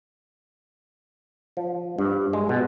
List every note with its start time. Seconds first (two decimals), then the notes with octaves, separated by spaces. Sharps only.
1.57 F3
1.99 G2
2.33 G#3
2.49 B2